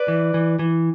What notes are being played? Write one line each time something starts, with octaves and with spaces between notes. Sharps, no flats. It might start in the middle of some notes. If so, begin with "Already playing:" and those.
Already playing: B4 D5
E3
E3
E3